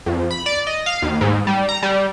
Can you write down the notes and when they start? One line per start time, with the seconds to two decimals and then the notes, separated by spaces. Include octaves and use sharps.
0.06 F2
0.31 B5
0.46 D5
0.67 D#5
0.86 F5
1.02 D#2
1.21 G#2
1.47 G3
1.69 A#5
1.83 G3